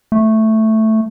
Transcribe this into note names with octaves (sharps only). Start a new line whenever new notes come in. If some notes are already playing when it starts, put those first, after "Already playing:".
A3